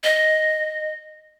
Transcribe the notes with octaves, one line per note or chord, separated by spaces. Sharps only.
D#5